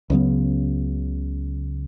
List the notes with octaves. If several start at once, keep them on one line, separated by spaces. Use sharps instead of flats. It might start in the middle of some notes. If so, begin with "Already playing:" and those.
C#2 C#3 F#3 B3